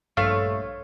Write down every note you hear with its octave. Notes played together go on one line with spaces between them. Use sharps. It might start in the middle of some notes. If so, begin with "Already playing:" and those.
A#1 G2 A3 C5 C#5 F5